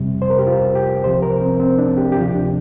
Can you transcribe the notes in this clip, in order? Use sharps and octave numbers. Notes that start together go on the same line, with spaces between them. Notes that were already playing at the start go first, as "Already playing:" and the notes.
Already playing: F2 C3 G3
C5
A#4
G4
F4
G4
C2 C3 F3 C5
A#4
C4
C4
D4
G4
G4
D2 C3 F3 F4
D4